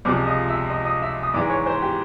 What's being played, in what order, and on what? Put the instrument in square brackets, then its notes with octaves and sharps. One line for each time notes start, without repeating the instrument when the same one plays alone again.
[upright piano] C#2 C3 F3 G#3 D5 D6
D#5 D#6
E5 E6
D#5 D#6
D#5 D#6
E5 E6
D#6
G#2 E3 G#3 D5 D6
C#5 C#6
C5 C6
G4 G5